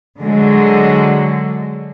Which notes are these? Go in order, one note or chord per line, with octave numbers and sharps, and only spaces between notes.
D3 F#3 G#3